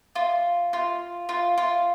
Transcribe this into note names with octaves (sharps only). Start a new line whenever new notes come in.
F4
F4
F4
F4